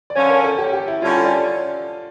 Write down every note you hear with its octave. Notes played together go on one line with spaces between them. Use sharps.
D5
D3 F3 C#4 C#5
A#4
A4
G4
G4
E4
D3 G3 C#4 F4
A4
D5